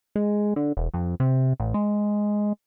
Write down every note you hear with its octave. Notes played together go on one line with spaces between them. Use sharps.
G#3
D3
E1
F2
C3
A1
G#3